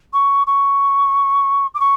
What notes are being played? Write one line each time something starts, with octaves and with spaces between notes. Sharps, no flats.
C#6
C#6
D6
C#6